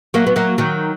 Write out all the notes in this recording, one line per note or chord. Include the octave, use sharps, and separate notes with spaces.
F#3 A#3
B3
F#3 A#3
D#3 F#3